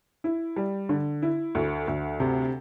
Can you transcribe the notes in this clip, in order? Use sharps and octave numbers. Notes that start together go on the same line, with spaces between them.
E4
G3
D3
E4
D2
D2
C3